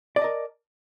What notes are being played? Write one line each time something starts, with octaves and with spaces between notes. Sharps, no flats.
A#4 D5 D#5 A5